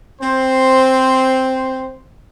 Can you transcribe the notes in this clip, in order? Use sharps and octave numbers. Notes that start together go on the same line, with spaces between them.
C4 C5